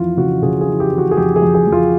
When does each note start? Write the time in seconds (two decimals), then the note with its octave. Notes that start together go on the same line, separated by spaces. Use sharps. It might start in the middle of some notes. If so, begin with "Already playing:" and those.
Already playing: F2 E3 F4
0.17 C#3 F#4
0.42 C#3 G#4
0.61 G#4
0.67 E3
0.80 G4
0.92 E3
0.98 F#4
1.11 G#4
1.17 F2 G4
1.36 G#4
1.42 F2
1.54 G#4
1.67 F2
1.72 F4